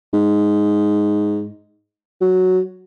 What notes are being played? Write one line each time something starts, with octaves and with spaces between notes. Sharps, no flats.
G#2
F#3